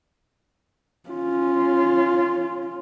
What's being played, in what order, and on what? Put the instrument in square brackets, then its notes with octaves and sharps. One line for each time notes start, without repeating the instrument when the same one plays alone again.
[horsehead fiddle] C#4 F4